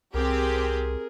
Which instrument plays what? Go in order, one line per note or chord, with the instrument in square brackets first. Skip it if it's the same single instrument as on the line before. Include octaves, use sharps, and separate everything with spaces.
[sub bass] C2 [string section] C4 G4 [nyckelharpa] G#4 A#4